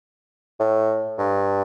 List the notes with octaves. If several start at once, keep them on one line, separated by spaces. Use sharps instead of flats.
A2
G2